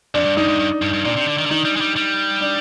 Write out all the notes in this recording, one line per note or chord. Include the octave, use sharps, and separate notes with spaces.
F2 D4
G2
G2 D#4
G#2
G2
G2
G2
A#2 D4
C3
D3
D#3
D3
D#3 D#4
G3
G#3
G3
G3
D4